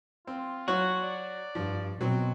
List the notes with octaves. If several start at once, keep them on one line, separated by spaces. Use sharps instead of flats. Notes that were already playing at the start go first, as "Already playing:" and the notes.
C4 F4
F#3 F#4 C#5 F#6
D5
G2 F3
B2 F#3 C4